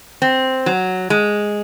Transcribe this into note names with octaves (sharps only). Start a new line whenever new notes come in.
C4
F#3
G#3